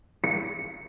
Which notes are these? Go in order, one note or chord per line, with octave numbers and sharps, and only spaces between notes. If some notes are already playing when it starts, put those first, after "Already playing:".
C#7